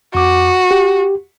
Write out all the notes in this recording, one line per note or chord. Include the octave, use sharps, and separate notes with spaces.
F2 F#4 D6
G4